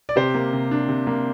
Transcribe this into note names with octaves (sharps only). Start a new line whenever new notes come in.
D5
C3 G4 C5
A#3
C3
D4
C3
A#3